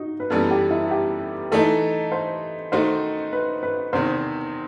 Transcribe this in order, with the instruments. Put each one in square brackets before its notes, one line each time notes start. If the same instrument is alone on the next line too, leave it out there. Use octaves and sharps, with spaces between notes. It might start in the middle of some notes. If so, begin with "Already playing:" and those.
Already playing: [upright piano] D#4 F#4
B4
[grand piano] F#2 E3 G3 B3 [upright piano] A4
[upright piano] G4
E4
G4
[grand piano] E3 A3 D#4 [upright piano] A4
[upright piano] C5
[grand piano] D#3 A3 D#4 F#4 [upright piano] C5
[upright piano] B4
B4
[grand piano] E2 C3 D#3 [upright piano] C5